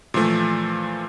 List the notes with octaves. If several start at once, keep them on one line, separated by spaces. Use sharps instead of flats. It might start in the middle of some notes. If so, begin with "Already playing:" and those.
A#2 E3 F3 A3